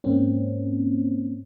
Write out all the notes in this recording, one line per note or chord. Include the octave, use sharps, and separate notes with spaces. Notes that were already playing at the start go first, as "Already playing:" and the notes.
G#2 A#3 C4 C#4